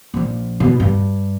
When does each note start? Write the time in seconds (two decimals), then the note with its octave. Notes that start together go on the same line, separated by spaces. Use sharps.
0.14 A#1 F3
0.60 B2
0.80 G2